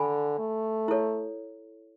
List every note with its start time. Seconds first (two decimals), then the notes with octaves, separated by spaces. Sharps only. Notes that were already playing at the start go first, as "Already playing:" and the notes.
Already playing: D3 A4 G#5 B5
0.39 A3
0.88 E4 A4 C#5